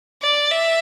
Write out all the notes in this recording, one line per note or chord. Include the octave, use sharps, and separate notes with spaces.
D5
E5